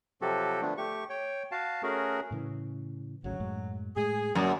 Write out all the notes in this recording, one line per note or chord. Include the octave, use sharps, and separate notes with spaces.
C3 F3 F#3 F#4 G4 A4
D3 F3 A3 B3 D4
A3 G4 C#6
C#5 G5
F#4 F5 A5
A3 C#4 F#4 G#4 A#4
A2 C#3 E3
G#1 D2 C#3 F#3
F#2 A2 G#3
A2 G#3 A3 G#4
F#2 D3 F3 F#3 A#3 B3 D4